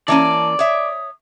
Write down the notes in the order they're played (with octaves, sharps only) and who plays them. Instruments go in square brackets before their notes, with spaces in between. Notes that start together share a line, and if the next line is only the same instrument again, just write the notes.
[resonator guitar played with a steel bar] E3 A#3 C#4 [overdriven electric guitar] D5 [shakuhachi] A5
[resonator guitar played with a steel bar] C#5 E5 [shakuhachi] D#6